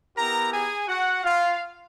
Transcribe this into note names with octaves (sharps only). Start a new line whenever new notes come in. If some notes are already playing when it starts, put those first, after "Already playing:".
B3 E4 G4 A#4 A#5
G#4 G#5
F#4 F#5
F4 F5